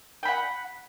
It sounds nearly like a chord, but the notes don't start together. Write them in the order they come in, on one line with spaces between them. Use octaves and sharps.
G5 B5 F#5